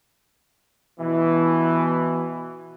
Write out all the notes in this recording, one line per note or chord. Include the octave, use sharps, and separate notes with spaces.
B2 E3